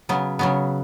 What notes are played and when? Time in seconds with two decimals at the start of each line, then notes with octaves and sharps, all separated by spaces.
0.09 C#3 F#3 B3
0.39 C#3 F#3 B3